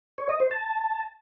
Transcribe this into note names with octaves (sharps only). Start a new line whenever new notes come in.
C#5
D#5
C5
A5